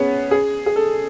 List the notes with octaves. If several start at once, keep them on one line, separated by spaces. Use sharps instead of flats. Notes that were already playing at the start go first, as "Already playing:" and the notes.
Already playing: B3 C#4 G#4
G#4
G#4
A4